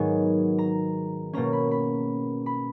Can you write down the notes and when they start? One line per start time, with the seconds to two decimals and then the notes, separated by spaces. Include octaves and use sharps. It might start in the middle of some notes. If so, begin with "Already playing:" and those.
Already playing: G#2 D#3 F#3 B3 D#4 G#5
0.58 A#5
1.33 B2 A#3 C#4 A#5
1.53 B5
1.71 B5
2.46 B5